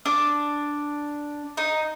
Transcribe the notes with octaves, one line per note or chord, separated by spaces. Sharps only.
D4
D#4